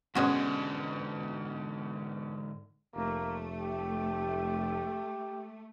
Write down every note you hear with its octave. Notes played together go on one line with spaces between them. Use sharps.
G#2 B2 D3 G#3 C#4 F#4
F1 A3 A#3
G4